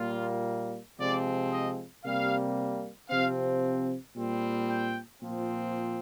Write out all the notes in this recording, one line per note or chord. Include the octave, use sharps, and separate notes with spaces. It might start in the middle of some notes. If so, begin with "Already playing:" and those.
Already playing: A#2 G3 A#3 F4
C3 F3 G#3 C4 D5
D#5
C3 G3 A#3 F5
C3 F3 C4 F5
A#2 G3 C4
G5
A#2 F3 C4